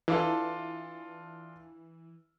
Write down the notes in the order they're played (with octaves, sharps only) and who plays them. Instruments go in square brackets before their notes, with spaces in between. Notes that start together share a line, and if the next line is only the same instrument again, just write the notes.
[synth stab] E3 [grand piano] D4 F4 A4